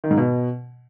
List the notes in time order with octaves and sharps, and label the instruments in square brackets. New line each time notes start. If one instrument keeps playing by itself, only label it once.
[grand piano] D#3
G#2
B2